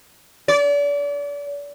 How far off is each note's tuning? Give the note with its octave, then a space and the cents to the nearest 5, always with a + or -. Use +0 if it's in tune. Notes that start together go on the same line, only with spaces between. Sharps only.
D5 -35